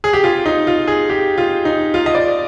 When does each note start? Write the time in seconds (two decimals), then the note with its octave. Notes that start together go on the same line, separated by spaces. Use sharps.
0.04 G#4
0.13 G4
0.23 F4
0.46 D#4
0.67 F4
0.87 G#4
1.10 G4
1.38 F4
1.65 D#4
1.94 F4
2.06 D#5
2.15 D5